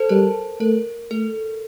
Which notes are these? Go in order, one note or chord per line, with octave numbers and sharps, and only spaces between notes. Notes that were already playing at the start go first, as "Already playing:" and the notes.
Already playing: A4 C5 A5
G3 A#4
A3 A#4
A3 A4